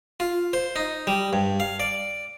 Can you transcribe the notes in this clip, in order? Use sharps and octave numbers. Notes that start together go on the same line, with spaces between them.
F4
C5
D#4
G3
G2
F5
D5